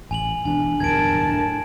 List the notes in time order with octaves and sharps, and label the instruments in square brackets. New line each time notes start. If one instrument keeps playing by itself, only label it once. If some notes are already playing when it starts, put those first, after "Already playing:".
[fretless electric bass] A1 [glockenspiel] G#5 F7 F#7
[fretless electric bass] E1 E2 [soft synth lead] D4 [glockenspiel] G#5
[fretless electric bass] D1 E2 G2 [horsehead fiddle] A#4 A5 [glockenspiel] G#6 D7
[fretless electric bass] A2